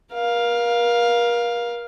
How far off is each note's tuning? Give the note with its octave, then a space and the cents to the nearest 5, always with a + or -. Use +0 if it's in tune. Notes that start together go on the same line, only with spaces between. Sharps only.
A#4 +35 F5 +5